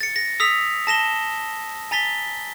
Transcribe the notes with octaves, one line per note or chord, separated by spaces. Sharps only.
A6 C#7
A#6
D#6 E6 B6 F7
A5 A#6 E7 G7
G#5 A#5 A6 B6 G7